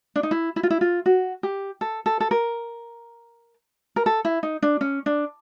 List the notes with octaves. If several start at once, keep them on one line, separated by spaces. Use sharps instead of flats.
D4
D#4
E4
E4
F4
E4
F4
F#4
G4
A4
A4
A4
A#4
A#4
A4
E4
D#4
D4
C#4
D4